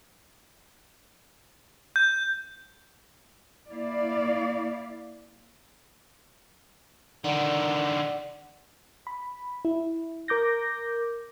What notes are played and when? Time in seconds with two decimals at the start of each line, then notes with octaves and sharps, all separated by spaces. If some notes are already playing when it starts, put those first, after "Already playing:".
1.96 G6
3.70 A#3 E4 D5 F5
7.24 D3 D#3 D5 F#5
9.07 B5
9.65 E4
10.28 A#4 D6 G6 A#6